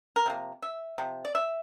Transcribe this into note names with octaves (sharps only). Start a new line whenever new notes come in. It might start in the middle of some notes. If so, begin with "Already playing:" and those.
A#4
C3 F3 A#3
E5
C3 F3
D5
E5